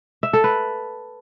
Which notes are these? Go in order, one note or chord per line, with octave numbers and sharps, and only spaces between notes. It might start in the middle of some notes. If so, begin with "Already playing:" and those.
E5
A4
B4